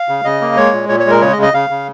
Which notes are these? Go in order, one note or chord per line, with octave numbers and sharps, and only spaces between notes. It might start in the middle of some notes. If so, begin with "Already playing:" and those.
Already playing: F5
C#3
C#3 D#5
A#3
G#3 C#5
A#2
A#2 C#5
C#5
G#3 A#4
C#3 C#5
D#5
C#3
D#5
C#3 F5
C#3